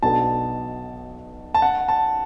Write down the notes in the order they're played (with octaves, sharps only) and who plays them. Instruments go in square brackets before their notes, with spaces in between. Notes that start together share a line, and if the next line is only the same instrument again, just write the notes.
[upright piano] B1 B2 B3 D4 A4 [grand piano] A5
[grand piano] A5
F#5
A5